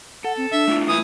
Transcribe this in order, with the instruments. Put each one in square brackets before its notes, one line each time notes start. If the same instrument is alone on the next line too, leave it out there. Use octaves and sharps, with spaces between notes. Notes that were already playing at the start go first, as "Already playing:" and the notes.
[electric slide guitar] A4 [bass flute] F#5
[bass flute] C4
[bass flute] D4 [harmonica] E5
[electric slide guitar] A3 E4 F4
[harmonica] E3 D#6